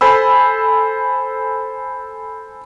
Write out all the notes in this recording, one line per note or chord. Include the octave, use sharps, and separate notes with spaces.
A4 C5 G#5 B5 E6